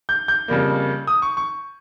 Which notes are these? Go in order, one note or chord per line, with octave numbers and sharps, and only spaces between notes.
G6
G6
F2 C#3 G3 A#3
D#6
C#6
C#6